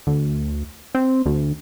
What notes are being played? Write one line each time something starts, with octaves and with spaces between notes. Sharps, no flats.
D2
C4
D2